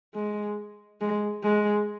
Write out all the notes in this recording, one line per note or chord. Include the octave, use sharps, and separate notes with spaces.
G#3
G#3
G#3